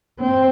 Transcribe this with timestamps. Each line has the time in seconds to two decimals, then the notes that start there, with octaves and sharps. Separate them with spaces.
0.21 C4